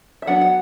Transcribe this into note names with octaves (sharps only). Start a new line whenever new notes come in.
E5
F#3 B3 D4 F#5
F#5